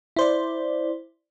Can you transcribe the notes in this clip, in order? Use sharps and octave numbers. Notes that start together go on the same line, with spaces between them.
E4 C5 D5